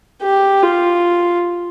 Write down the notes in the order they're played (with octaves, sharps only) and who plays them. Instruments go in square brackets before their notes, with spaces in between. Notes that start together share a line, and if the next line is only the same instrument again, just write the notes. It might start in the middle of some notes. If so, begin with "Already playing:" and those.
[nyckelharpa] G4
F4